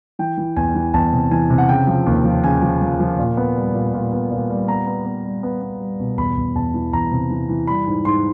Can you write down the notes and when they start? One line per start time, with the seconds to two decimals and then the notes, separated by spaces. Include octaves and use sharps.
0.19 E3 G5
0.38 E3
0.56 E2 G#5
0.75 E3
0.94 E2 A5
1.12 C3
1.31 E3 G#5
1.50 C3
1.58 F#5
1.69 C#3 G5
1.87 F3
2.06 D#2
2.25 F3
2.43 C#3 G#5
2.62 F3
2.81 F3
3.00 F3
3.19 A#2
3.37 B3
3.56 G3
3.74 A#2
3.94 A#2
4.12 B3
4.31 A#2
4.50 G3
4.68 B3 A#5
4.87 B3
5.06 B3
5.24 G3
5.43 B3
5.62 B3
5.81 G3
6.00 B2
6.18 E2 B5
6.37 E2
6.55 E2 A5
6.74 E3
6.93 E2 A#5
7.12 C3
7.30 E3
7.49 E3
7.67 G3 B5
7.87 G#2
8.05 G#2 C6